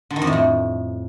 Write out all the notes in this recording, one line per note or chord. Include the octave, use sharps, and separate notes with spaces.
D3
D#3
F2
A2
F2